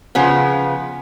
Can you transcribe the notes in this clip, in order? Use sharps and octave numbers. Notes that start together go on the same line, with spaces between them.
C#3 F3 B3